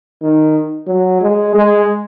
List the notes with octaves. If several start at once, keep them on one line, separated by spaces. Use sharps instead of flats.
D#3
F#3
G#3
G#3